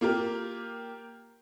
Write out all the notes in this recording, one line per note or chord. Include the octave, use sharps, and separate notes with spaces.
A#3 F4 G4 A#4